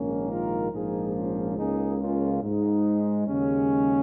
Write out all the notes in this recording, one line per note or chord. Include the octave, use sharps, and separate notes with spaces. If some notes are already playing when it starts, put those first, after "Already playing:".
Already playing: A#1 G#2 D#3 A#3 C#4
F4 A#4
A#1 G#2 F3 A#3 D#4 G#4
C#4 F4
C#2 C#3 A#3 D#4 G#4
C#4 F4
G#2 G#3 D#4
D#2 C#3 G#3 C#4